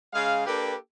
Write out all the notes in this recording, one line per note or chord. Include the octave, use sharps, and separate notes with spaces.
C#3 G#3 G#4 F5
A#3 D4 G4 A4 B4 G5